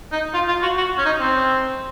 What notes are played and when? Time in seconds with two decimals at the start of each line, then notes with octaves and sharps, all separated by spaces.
0.12 D#4
0.34 F4
0.48 F4
0.62 F#4
0.77 F#4
0.98 C#4
1.05 D#4
1.20 C4